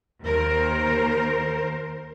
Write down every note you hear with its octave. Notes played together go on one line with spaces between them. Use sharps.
D#2 A#4 C5